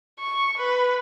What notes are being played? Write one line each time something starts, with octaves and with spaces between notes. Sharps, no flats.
C#6
B4